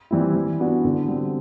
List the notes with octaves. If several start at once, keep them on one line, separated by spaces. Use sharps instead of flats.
E3 G3 C4 E4
E3
B3 D4 F#4
D3
G3 C4